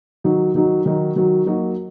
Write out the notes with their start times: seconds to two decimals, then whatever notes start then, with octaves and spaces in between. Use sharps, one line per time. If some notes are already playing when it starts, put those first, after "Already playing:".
0.24 D#3 F#3 D#4 F#4
0.55 D#3 F#3 D#4 F#4
0.86 D#3 F#3 D#4 F#4
1.16 D#3 F#3 D#4 F#4
1.46 F#3 A#3 D#4 F#4